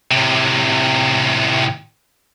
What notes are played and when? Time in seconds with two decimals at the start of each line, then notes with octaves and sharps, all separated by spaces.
0.11 A2 C3